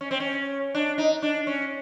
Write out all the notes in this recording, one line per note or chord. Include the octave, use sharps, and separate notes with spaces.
C#4
C4
C#4
D4
D#4
D4
C#4